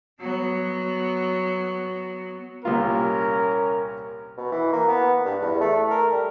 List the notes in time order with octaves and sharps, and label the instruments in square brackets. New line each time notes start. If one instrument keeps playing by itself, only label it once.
[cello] F#3 B3
[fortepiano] C2 A#2 F4 [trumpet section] C#4 A#4
[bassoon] B2
E3
A#3
B3
G2
E2
A3
A#4
G3